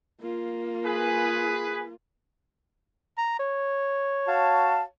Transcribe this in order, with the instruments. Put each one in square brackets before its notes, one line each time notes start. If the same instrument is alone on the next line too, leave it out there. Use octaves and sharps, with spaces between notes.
[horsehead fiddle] A#3 F4
[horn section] G#4 B4
[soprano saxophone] A#5
C#5
[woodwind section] F#4 F5 A5